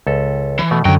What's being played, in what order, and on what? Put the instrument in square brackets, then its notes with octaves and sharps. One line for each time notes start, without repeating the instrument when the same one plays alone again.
[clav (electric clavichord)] C#2 A4
[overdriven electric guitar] E3
[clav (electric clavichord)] B2 A3
[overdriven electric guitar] C#2 G5 [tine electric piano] F#2 D3 [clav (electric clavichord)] F#3 D#5 A#5